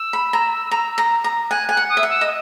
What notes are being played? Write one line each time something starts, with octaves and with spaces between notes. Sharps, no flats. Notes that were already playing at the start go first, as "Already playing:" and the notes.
Already playing: E6
B5
A#5
A#5
A#5
A#5
G#5 F#6
G#5 F#6
F#5
D#6
E5
F#5
E6
D#5